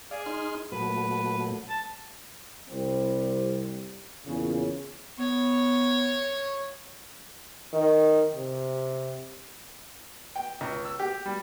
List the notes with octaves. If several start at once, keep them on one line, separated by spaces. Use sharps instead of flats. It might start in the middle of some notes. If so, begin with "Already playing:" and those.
G#4 D5 F5
D#4 C6 F6
A#2 F#3 A3 B4
A5
C2 G3 C4
E2 A#2 C#3
B3 C#5
D#3
C3
G5
C#2
E6
G4
G3